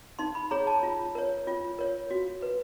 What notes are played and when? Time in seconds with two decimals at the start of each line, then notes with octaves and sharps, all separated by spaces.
0.19 D#4 C6
0.35 B5
0.51 G#4 C#5 A#5
0.67 A5
0.83 F4
1.15 A#4 C#5
1.47 F4
1.79 A#4 C#5
2.11 F#4
2.42 B4